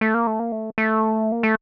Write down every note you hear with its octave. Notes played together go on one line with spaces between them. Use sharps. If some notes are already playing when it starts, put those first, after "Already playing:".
A3
A#3
A3
A#3
A3
A3
A#3
A3